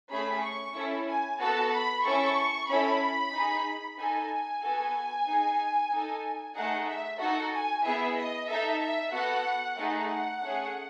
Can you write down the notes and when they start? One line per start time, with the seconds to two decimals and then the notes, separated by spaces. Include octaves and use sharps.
0.11 A3 C#4 G#4 B5
0.43 C#6
0.76 C#4 E4 A4
1.07 G#5
1.40 B3 F#4 A4 A5
1.72 B5
2.04 C#4 E4 A4 C#6
2.69 C#4 E4 A4 B5
3.33 D#4 G#4
3.97 D#4 A4 G#5
4.62 B3 F#4 A4
5.26 D#4 G#4
5.91 D#4 A4
6.55 A3 D#4 G#4 F#5
6.87 E5
7.20 D#4 F#4 A4 F#5
7.52 G#5
7.84 B3 E4 G#4 E5
8.16 D#5
8.48 D#4 A4 E5
8.81 E5
9.13 B3 F#4 A4 F#5
9.77 A3 D#4 G#4 F#5
10.42 A3 C#4 G#4